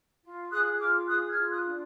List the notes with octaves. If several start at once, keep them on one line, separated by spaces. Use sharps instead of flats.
F4
G#4 D#6 F#6
F4 D6 F6
G#4 D#6 F#6
F6 G#6
F4
D#6 F#6
D4